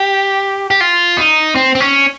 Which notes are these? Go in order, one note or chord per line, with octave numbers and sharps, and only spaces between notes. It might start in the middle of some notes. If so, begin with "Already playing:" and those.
Already playing: G4
G4
F4
D#4
C4
C4
C#4